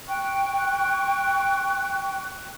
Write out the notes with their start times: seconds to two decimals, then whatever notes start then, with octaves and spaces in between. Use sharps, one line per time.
0.07 G5 C#6 F#6